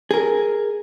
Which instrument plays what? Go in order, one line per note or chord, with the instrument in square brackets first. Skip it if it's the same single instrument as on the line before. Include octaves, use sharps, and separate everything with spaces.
[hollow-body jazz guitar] G#4 A#4